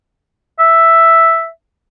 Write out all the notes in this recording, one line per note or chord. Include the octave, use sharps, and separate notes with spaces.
E5